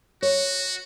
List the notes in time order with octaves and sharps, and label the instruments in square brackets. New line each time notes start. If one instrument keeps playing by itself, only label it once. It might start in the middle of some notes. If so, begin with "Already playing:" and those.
[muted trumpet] F#4 [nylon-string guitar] C#5